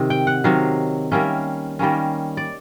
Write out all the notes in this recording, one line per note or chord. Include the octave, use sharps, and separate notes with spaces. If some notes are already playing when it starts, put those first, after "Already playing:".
Already playing: C3 D#3
G5
F#5
C3 D#3 F#3 F5
D#3 G3 A#3 C#4 E5
D#3 G3 A#3 C#4
D5